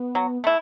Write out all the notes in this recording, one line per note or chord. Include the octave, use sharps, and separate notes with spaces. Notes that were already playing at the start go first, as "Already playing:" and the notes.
Already playing: B3
F#3
A3 E4